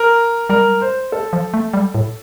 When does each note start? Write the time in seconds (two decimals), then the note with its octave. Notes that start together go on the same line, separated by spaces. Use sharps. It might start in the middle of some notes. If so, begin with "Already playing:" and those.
Already playing: A#4
0.49 G3 A#4
0.81 C5
1.12 A4
1.33 F3
1.54 A3
1.74 G3
1.94 A2